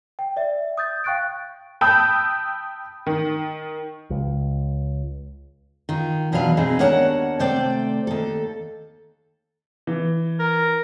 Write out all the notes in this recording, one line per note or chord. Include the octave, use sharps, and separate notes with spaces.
G5
D5 E5
D#6 G6 A6
F5 G5 C#6 F#6 A6 D7
G5 A5 B5 D#6 E6 G6
D#3
C#2
D#3 F4
E2 B2 F#3 D4 B4 F5
B2 C4 D#4 G#4
D#2 D4 A#4 C#5 F#5 A5
C3 A3 C5 D5 G5
D#2 A4
E3
A#4